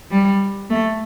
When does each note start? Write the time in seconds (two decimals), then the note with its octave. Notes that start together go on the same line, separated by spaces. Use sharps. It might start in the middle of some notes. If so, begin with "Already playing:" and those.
0.11 G3
0.70 A3